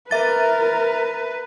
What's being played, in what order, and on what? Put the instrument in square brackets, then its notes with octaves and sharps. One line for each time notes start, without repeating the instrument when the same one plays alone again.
[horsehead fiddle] A#4 [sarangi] B4 [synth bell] E5 A6